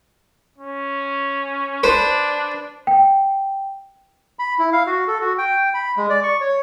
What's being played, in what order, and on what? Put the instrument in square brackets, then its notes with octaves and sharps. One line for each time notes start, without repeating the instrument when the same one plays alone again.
[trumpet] C#4
[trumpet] D4 [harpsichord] B4 C5
[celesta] G5
[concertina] B5
E4
F5
F#4
A4
F#4
G5
B5
G#3
D5
C#6
C#5